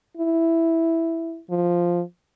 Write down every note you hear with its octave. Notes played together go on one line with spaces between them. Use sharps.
E4
F3